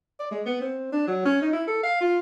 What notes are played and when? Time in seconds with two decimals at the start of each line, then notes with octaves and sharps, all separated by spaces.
0.19 D5
0.31 G#3
0.46 B3
0.61 C4
0.92 D4
1.07 F#3
1.25 C#4
1.42 D#4
1.53 E4
1.67 A4
1.83 F5
2.01 F4